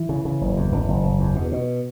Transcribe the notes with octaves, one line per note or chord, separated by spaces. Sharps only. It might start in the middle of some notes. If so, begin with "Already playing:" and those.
Already playing: E3
C#3
C#3
F#1
E2
F#1
F#1
F#1
E2
B2
B2